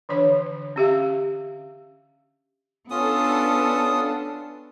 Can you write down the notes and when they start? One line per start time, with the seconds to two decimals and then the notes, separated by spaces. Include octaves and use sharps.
0.09 D3 E3 D4 C#5
0.36 D3
0.76 C#4 G4 E5 F5
2.90 B3 C#4 D4 F4 A4 D#6